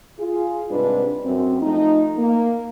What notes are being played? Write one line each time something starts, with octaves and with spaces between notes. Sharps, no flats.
F4 G#4
G#2 C3 G3 D4 B4
F#2 C4
F3 A3 D#4
A#3